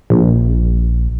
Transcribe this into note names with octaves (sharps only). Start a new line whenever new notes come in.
A#1